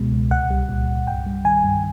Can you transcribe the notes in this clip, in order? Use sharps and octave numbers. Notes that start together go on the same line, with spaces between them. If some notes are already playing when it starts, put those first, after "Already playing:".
Already playing: C#2 B2 G#3
C#2
C2 F#5
G3
A#2
C2
G2 G5
G3
D#3 G#5
G2